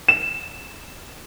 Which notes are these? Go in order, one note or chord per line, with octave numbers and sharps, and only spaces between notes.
E7